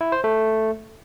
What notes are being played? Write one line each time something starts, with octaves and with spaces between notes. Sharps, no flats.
E4
C5
A3